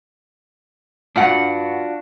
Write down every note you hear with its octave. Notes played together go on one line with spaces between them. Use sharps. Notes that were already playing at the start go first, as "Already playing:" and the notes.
G2 D4 F4 F#4 F#5